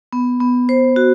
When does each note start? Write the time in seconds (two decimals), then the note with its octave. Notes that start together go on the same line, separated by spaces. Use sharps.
0.13 B3
0.41 B3
0.69 C5
0.96 F#4